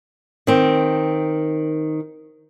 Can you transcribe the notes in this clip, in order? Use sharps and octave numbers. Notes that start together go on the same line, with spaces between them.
D#3 C4